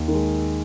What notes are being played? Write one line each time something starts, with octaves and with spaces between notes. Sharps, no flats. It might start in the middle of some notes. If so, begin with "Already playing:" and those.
Already playing: D#2
D#3 G#3